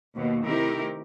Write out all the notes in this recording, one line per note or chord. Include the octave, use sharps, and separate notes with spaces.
D#2 B2
C3 D#3 A3 E4 G4 A#4